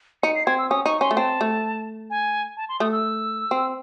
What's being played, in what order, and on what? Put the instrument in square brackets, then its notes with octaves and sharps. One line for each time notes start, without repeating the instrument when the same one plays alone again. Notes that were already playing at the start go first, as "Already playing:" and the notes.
[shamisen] D#4 [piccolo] C#7
[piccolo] C7
[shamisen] C4 [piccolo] G#6
[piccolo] E6
[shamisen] C#4 [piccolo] D#6
[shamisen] D#4 [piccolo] C#6
[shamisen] C#4 [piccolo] C6
[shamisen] A3
[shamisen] C4 [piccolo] A5
[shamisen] A3
[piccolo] G#5
A5
C6
[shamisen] A3 [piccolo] D#6
[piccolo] E6
[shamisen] C4